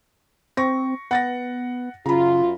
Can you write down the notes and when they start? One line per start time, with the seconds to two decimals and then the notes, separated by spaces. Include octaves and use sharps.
0.57 C4 C#6 A#6
1.11 B3 F#5 A6 A#6
2.06 F#2 C#3 F4 A#5 B5